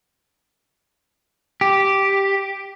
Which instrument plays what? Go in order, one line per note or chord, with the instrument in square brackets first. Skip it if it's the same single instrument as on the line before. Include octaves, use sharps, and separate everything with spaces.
[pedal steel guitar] G4